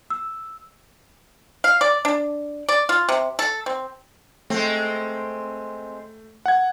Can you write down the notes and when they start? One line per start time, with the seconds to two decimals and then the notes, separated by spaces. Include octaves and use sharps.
0.10 E6
1.64 F5
1.81 D5
2.05 D4
2.69 D5
2.89 F4
3.09 C3
3.39 A4
3.66 C4
4.50 G#3 A3 C4
6.46 F#5 G#6